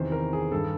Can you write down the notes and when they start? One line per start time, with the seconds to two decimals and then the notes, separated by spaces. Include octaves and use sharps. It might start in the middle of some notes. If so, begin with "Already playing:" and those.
Already playing: E2 C3 D#3 C5
0.12 A#4
0.33 G#4
0.52 G2 D#3 A4